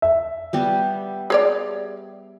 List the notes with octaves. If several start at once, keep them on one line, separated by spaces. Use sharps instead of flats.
E5
G3 B3 G4
G#4 C#5 D5